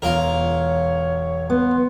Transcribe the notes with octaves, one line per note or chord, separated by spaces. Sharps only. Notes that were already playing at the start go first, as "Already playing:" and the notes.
E1 F4 A#4 C#5
B3 C6